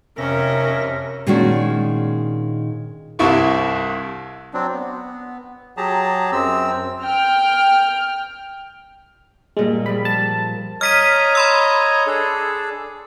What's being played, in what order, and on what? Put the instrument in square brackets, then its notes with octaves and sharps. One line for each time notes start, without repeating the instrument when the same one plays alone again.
[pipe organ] F2 E5 A#6 [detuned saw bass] C3 [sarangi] C#4 [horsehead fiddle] A#4
[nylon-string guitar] A#2 D#3 G#3 C#4 D4 F#4
[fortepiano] C2 G2 E4 C#6
[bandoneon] F#3 C4 D4
B3
F#3 G4 G#4 A5 A#5
F#2 C4 E6
[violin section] G5 F6
[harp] G2 A#2 G3 [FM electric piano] G#3
[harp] F3 G3 [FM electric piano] B5
[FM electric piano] A5
[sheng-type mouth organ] C#5 D#5 A#5 [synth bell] F6 B6 D#7
[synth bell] B5 C6 E6
[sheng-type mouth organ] D4 G#4 A4